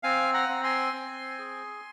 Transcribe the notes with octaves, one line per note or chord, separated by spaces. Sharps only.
C4 F5 G#5
F#5 A#5
C4
G#5 C6
C4
G#4